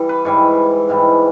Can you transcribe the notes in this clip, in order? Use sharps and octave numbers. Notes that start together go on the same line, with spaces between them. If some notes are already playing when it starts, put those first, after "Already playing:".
Already playing: E3 G3
B4
G#2 E3 G3 C#5
G#2 E3 G3